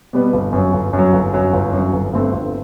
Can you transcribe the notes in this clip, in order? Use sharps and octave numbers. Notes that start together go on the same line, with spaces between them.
B2 G3 B3
G1
F#2
F#3
G1
F#2
F#3
G1
F#2 F#3
G1
F#2 F#3
G1
G2 D3 A3 C4
G1